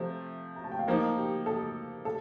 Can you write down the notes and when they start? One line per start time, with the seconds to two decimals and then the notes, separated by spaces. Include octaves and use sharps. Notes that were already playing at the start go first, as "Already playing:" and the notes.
Already playing: C3 F3 A3
0.56 A#5
0.64 A5
0.71 G5
0.79 F5
0.87 F3 A#3 D#4 D#5
1.17 G4
1.46 A4
2.05 A4